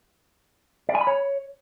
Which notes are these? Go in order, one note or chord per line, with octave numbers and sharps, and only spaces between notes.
D5
G#5
B5
C#5